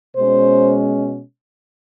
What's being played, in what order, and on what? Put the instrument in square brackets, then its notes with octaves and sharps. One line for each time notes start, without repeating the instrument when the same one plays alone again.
[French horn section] B2 G#3 C#4 C5